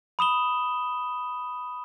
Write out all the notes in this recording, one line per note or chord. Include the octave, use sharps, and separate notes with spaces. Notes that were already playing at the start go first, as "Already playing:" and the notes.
B5 D#6 E7 G7